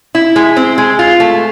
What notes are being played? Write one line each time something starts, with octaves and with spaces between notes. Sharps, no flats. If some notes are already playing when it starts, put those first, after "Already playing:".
E4
G#3
C4
G#3
F4
A3